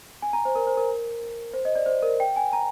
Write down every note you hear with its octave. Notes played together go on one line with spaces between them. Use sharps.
G#5
A#5
C5
A#4
C5
A#4
C5
D#5
D5
C5
A#4
G5
G#5
A#5